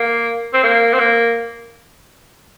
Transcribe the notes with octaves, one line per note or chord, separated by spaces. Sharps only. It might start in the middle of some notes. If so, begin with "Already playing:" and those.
Already playing: A#3
C4
A#3
C4
A#3